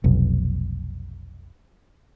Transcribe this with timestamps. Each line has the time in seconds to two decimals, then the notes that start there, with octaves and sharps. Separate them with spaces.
0.04 F1 B1